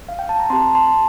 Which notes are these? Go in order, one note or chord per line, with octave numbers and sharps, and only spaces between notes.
F5
G5
A5
A#5
C4 G4 A5 C6
A5 C6